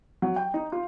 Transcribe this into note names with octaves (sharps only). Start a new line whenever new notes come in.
F#3
G5
D#4
F4